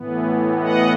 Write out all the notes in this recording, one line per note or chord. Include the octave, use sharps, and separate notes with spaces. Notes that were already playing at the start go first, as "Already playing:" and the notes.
Already playing: A2 E3 B3
D#5 F#5